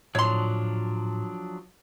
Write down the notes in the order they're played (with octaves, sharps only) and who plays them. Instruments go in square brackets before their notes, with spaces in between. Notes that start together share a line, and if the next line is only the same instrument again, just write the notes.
[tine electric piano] A2 [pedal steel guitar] F3 F#3 D4 [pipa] C#5 C6